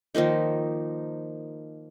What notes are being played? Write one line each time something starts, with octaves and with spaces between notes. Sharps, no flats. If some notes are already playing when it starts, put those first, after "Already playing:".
D#3 F3 A#3 D#4